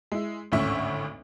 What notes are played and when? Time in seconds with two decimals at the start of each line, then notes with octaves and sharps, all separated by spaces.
0.12 G#3 E4
0.52 G#1 D2 A2 C#4 E5 C#6